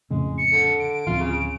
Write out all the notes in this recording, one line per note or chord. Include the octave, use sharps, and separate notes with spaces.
F2 A2 C#3 G#3
C#7
D3
D7
D1 F3 C4 F4
C#3